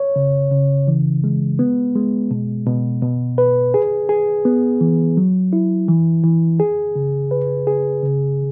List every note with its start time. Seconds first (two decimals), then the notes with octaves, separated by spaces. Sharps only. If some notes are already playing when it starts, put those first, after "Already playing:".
Already playing: C#5
0.16 C#3
0.52 C#3
0.88 E3
1.24 G#3
1.59 B3
1.95 G#3
2.31 B2
2.67 B2
3.02 B2
3.38 B4
3.74 G#4
4.09 G#4
4.45 B3
4.81 E3
5.17 F#3
5.53 E4
5.88 E3
6.24 E3
6.60 G#4
6.95 C#3
7.31 B4
7.67 G#4
8.03 C#3